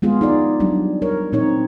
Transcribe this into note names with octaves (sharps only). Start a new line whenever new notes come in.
G#3 B3 F4 G#4
D#4 G#4 D5
F#3 G3 D4
A#4 C#5
A#2 C4 D#4 C#5